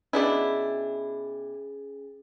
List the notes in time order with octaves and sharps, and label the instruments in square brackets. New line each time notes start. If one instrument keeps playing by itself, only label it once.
[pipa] B2 D4 E4 [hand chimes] C#4 G#4 A6